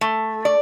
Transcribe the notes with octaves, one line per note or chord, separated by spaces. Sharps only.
A3
D5